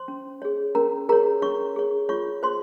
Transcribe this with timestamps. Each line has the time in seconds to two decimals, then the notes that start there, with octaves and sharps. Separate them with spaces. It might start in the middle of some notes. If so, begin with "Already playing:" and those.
Already playing: C5 C6
0.08 C#4
0.42 G#4 C#5
0.75 C#4 A#4 A#5
1.09 G#4 A#4 C#5 A#5
1.42 C#4 C#5 C#6
1.76 G#4 C#5
2.09 F4 C#5 C#6
2.43 G#4 C5 C#5 C6